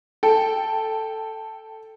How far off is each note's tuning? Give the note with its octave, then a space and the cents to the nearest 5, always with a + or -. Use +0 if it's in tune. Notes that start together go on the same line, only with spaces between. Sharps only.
A4 +0 G5 +0